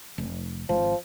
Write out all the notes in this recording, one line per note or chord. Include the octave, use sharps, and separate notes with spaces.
F1
G#1 F3